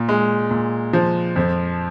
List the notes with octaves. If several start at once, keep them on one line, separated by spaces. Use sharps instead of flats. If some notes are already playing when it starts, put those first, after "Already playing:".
Already playing: A#2
G#3
A#2
F3
F2